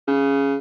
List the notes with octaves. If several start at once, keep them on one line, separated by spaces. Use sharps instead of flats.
C#3